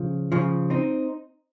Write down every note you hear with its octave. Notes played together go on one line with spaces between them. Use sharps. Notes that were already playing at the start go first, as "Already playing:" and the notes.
Already playing: C#3 F3
C#3 F3
C4 D#4